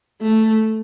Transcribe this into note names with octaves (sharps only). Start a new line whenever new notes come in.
A3